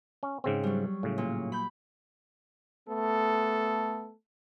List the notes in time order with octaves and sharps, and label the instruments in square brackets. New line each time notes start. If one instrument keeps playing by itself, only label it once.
[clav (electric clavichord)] C#4
G#2 C#3 C4
[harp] F#3 G3
[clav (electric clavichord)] A2 C#3
[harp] A#2
B5 G6
[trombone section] A3 B3 A4